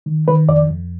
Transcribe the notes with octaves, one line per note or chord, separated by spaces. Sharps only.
D#3
D#3 B4
F2 D5
F2